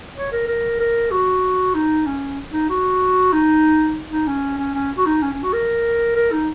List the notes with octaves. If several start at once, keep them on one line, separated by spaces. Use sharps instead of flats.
C#5
A#4
A#4
A#4
F#4
D#4
C#4
D#4
F#4
D#4
D#4
C#4
C#4
C#4
F#4
D#4
C#4
C#4
F#4
A#4
A#4
D#4